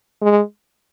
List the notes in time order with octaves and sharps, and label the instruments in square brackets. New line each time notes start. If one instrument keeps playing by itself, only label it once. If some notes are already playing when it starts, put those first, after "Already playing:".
[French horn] G#3